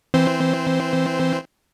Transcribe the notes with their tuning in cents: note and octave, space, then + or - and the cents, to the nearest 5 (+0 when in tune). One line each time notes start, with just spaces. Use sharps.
E3 +0 C4 +0 C5 -15